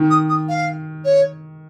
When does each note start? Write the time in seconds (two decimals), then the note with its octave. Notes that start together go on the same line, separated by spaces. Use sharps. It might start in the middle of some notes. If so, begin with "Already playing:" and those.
Already playing: D#3
0.10 D#6
0.29 D#6
0.49 F5
1.05 C#5